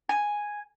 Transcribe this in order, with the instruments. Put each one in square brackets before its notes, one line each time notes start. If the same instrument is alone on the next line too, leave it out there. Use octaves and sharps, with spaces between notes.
[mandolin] G#5